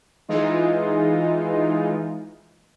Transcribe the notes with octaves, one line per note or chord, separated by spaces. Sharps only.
E3 G#3 D#4 F4